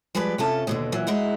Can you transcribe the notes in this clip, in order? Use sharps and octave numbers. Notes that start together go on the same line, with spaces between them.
F3 G3 G#3 B4 D5
C3 C#4 F4 A4 A5
D#2 B2 D3
A#2 E3 F#3
G#3 D#4 E4 F#4